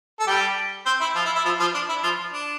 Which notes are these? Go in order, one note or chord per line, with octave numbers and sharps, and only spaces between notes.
A4
G3 G4
C4 C5
E4
F3 F4
E4
E4
F3 F4
F3 F4
D4
E4
F3 F4
D4